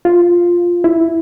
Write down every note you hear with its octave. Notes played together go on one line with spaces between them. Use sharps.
F4
E4